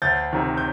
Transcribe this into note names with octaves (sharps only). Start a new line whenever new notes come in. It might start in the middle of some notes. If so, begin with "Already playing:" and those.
D2 G6 A6
C3 D#3
G6